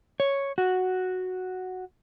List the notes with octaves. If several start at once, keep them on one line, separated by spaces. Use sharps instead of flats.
C#5
F#4